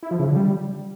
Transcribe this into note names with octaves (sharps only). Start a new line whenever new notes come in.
E4
F3
C#3
D3
G3